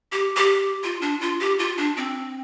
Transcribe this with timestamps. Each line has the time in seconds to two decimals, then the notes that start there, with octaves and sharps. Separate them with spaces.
0.12 G4
0.37 G4
0.84 F4
1.02 D4
1.21 F4
1.40 G4
1.59 F4
1.78 D4
1.97 C4